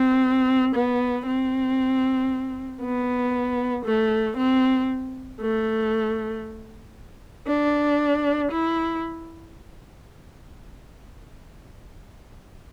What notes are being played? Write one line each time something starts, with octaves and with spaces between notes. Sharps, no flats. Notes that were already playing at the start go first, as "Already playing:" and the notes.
Already playing: C4
B3
C4
B3
A3
C4
A3
D4
E4